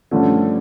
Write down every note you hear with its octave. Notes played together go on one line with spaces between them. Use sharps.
G2 D3 F3 A3 C#4